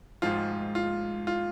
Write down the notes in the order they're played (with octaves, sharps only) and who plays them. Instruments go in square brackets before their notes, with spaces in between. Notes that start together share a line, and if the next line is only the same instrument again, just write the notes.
[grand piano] G#1 G#2 F3 F4
F4
F4